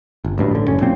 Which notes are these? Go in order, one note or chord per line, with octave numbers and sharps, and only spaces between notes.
G1
A1 D2 G2
A1 D3
F#1 C#4
B1 A#2 C4